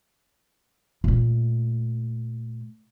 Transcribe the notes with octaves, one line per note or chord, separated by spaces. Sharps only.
A#2 A3